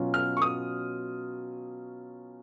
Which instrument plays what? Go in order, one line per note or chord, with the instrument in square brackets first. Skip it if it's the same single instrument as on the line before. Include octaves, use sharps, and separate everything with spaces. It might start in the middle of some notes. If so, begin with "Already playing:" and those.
Already playing: [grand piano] B2 F#3 C#4 F4
[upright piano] F6
C#6
D#6